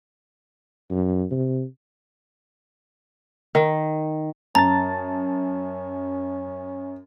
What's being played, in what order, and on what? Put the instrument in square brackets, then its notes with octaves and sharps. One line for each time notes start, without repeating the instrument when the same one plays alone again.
[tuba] F#2
C3
[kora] D#3
[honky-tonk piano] F#2 [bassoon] C#4 [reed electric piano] A5 A6 [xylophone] A#5